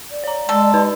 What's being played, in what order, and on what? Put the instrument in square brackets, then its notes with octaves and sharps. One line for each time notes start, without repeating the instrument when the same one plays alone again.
[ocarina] D5
[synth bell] C#5 A#5
[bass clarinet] G#3 [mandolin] A4
[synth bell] D#4 B4